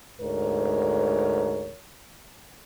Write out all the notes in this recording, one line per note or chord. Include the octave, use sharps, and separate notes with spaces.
D2 G#2 A#4 C#5